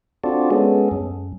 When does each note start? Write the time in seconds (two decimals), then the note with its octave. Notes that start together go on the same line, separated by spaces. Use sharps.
0.24 C4 D4 F4 F#4 A4 D5
0.51 G#3 B3 C#4 G#4 A4
0.91 F#2